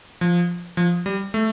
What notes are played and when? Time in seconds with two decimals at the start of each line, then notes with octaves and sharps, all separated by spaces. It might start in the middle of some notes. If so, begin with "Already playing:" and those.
0.21 F3
0.77 F3
1.06 G3
1.34 A3